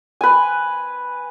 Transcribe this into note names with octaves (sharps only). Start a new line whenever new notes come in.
B4 G#5